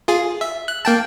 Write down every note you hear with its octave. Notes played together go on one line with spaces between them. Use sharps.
F4 G#4
E5
F#6
A#3 G5 A5